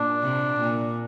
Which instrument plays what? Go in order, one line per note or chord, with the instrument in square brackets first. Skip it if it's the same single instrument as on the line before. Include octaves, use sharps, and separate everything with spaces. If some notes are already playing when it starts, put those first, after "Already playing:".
Already playing: [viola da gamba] A#2 [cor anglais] D4
[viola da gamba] C3
A#2